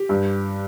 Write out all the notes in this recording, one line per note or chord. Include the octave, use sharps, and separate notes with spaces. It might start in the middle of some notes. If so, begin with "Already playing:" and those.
Already playing: G4
G2